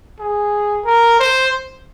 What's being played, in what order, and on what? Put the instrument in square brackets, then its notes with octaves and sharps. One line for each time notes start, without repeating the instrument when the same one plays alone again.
[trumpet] G#4
A#4
C5